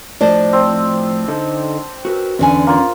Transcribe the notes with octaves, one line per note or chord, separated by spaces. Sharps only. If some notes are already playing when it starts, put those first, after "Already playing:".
A2 F3 D4 C5 D5 D#5
C4
D3 D#4 A4
F#4 A#4 B4
E2 D3 C#4 G#5
A#3 F4